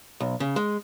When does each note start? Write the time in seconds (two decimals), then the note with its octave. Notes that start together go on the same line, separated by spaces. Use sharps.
0.20 B1
0.40 C#3
0.56 G#3